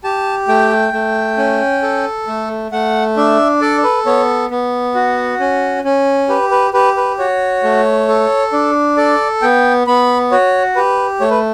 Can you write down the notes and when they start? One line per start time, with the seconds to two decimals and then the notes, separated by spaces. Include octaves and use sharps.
0.04 G4 A5
0.48 A3 G5
0.93 A3
1.38 C#4
1.82 A4
2.27 A3
2.71 A3 F#5
3.17 D4 E5
3.61 A4 D5
3.83 B4
4.06 B3 C#5
4.51 B3
4.95 F#4
5.40 C#4
5.84 C#4
6.29 G4 B4
6.51 B4
6.74 G4 B4
6.97 B4
7.18 F#4 C#5
7.63 A3
8.08 A4
8.52 D4
8.97 A4 D5
9.42 B3 G5
9.87 B3 B5
10.31 F#4 C#5
10.76 G4 B4
11.20 A3 C#5
11.30 B4